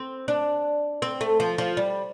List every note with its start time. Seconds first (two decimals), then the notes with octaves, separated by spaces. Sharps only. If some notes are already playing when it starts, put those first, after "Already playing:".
Already playing: C4
0.28 D4
1.02 C4
1.21 A3
1.40 F3
1.58 F3
1.77 G3